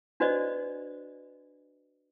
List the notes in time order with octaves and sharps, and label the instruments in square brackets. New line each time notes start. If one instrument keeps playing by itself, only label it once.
[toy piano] D4 F#4 B4 C5 D5 D#5